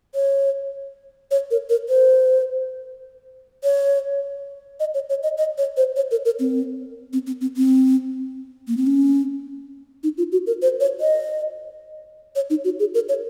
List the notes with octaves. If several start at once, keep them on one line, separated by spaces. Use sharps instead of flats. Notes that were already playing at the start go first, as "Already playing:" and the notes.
C#5
C#5
A#4
A#4
C5
C#5
D#5
C#5
C#5
D#5
D#5
C#5
C5
C#5
A#4
A#4
C4
C4
C4
C4
C4
A#3
C4
C#4
D#4
F4
F#4
A#4
C5
C#5
D#5
C#5
D#4
F#4
G#4
A#4
C#5